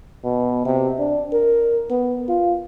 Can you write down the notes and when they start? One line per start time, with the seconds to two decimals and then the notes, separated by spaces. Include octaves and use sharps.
0.24 B2
0.65 C3
0.99 D4
1.33 A#4
1.90 B3
2.28 F4